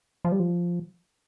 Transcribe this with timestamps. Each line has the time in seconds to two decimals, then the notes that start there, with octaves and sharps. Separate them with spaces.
0.25 F3
0.32 G3
0.40 F3